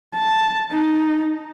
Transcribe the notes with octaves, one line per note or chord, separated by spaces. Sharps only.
A5
D#4